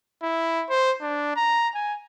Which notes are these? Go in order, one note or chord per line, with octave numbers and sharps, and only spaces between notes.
E4
C5
D4
A#5
G#5